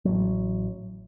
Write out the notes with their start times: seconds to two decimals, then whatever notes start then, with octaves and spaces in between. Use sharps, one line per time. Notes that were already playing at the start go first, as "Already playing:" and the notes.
0.05 A1 F#3